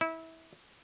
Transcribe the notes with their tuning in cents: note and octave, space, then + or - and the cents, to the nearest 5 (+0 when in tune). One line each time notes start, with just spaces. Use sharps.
E4 -25